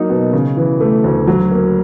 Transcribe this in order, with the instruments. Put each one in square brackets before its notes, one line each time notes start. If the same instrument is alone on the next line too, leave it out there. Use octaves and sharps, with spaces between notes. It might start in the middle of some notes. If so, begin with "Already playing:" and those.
Already playing: [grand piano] F#3 A#3 D#4
B2
C#3
E3
A3
D2
F#3
A#3